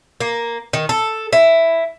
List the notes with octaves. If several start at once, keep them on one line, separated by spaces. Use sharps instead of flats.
A#3
D#3
A4
E4